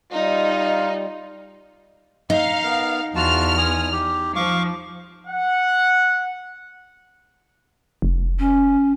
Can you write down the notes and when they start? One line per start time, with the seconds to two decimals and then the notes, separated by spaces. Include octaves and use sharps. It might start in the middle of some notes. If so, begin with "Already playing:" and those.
0.12 G3 D#4 F4
2.30 D#4 F5
2.64 B3 A#4
3.15 E2 F4 F#4 A5 F6
3.58 G#5 D#6
3.92 G4
4.36 F3 F5 C#6 D6
5.27 F#5
8.02 F1
8.39 C#4